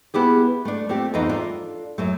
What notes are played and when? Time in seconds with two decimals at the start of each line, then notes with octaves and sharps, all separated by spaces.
0.14 B3 E4 G4 G#4
0.65 A3 D4
0.89 A3 C4 F4 G4
1.14 F2 E3 B3 D#4 A4 F5
1.29 D4 F4 A4
1.98 F#2 F#3 A3